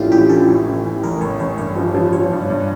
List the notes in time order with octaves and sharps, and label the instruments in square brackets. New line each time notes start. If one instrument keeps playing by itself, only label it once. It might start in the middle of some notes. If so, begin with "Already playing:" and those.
Already playing: [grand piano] A1 A2 E3 [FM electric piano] C#4 D4 E4 F4 G4
[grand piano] A1 [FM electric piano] G4
[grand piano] E3 [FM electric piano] A4
[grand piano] A1
A1
E3
[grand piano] A1 [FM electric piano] A#4
[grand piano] A1 [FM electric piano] C#5
[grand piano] A1 [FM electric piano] C#5
[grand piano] G2 [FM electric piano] C#5
[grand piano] F3
F3
[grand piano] F3 [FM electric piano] C#5
[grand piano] G2
G2